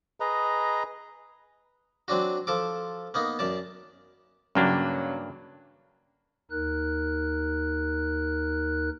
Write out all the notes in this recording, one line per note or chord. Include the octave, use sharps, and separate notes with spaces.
G#4 B4 D#5 A#5
F#3 C4 D4 F#4
F3 A4 D6
A#3 B3 D#4
F#2 D5 A5
G2 C#3 F#3 A#3 D4
D#2 D#4 A#4 F#6